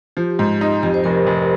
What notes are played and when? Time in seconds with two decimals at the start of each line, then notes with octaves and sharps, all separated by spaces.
0.17 F3 G4
0.39 G#2
0.61 D#4
0.83 F2 G4
0.94 C5
1.04 F1 A#4
1.27 F1